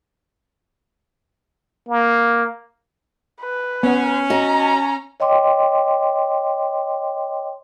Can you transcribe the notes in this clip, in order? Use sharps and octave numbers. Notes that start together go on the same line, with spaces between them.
A#3
B4
B3 C#4
F#4 D#5 A#5
C#5 D#5 G5 C6 D6